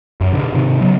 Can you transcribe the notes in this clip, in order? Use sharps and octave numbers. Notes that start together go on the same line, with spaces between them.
F#2
B2 D3
G#2 C3 D#3
C#3 F#3 B3